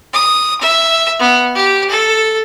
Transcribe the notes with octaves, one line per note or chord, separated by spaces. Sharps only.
D#6
E5
B3
G4
A4